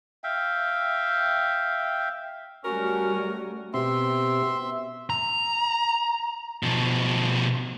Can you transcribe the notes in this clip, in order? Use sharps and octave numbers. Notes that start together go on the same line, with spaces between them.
E5 F5 G5
G3 A3 C#4 F#4 A#4
B2 C4 G4 E5 C6
A#5
B2 F3